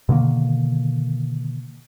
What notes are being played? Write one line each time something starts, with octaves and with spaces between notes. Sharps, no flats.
B2 D3 D#3 A#3